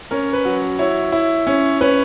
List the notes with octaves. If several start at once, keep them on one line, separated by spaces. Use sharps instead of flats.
C#4 A#4
B4
F#3
E4 C#5
E4
C#4
C#4 B4